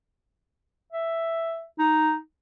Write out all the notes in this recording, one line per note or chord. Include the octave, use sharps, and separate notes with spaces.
E5
D#4